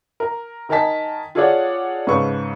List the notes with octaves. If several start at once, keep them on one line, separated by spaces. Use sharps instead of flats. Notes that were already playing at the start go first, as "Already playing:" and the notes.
A#4
D#3 A#4 D#5 G#5 A5 B6
F4 G#4 A4 C#5 D5 F#5
G#2 C#3 A4 B4 C#6